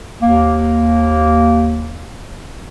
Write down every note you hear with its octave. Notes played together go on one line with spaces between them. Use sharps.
D#2 A#3